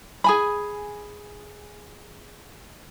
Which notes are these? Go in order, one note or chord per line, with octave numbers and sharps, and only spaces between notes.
G#4 G#5 B5